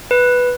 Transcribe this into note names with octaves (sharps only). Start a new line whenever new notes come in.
B4